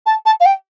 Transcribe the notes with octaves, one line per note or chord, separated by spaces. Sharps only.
A5
A5
F5
G5